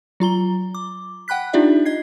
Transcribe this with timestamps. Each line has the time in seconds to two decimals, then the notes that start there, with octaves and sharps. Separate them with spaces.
0.20 F#3 F4 A#5 G7
0.75 D6
1.28 F#5 G5 B5 F#6 B6
1.53 D4 D#4 F4 G4 D5 E5
1.86 D#5 G#6 C7